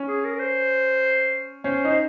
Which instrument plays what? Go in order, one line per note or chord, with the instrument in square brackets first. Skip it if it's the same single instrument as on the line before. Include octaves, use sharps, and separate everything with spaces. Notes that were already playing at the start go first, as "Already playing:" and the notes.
Already playing: [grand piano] C#4
[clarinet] G#4
A#4
A#4
C5
[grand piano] C#4 [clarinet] C5
[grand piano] D#4 [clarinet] C5